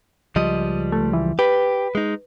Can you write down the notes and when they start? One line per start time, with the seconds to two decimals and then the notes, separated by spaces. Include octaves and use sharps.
0.36 C#2 F3 G3 D#5
0.92 A3
1.13 E3
1.39 G4 B4
1.95 G#3 D#4